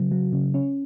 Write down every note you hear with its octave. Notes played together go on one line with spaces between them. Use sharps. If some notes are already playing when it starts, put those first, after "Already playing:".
Already playing: C#3 F#3
F#3
C#3
C#4